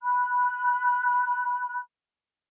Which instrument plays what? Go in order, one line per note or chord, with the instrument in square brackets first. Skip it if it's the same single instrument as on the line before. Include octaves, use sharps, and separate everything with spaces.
[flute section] B5 F#6